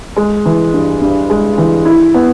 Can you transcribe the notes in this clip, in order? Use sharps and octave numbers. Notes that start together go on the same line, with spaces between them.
G#3
E3
G2
G2
G#3
E3
E4
B3